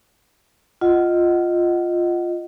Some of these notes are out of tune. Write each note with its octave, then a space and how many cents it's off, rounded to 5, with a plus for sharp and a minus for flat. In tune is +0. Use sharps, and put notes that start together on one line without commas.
F4 +0 D#5 +0 F#5 +15